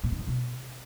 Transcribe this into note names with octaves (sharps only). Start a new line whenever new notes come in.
A#2
D#3
F2
B2